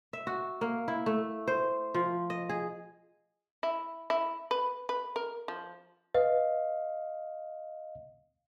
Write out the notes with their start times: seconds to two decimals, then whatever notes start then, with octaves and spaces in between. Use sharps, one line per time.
0.13 E5
0.27 F#4
0.61 A#3
0.88 E4
1.06 A3
1.47 C5
1.94 F3
2.30 D#5
2.49 G#4
3.63 E4
4.10 E4
4.51 B4
4.89 B4
5.16 A#4
5.48 F3
6.14 B4 D#5 F5